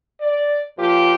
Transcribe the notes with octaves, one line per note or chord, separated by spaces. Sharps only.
D5
A#2 F3 F4 G4